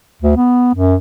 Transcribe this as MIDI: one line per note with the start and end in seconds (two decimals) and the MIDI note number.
0.22 0.36 38
0.37 0.74 59
0.75 0.95 42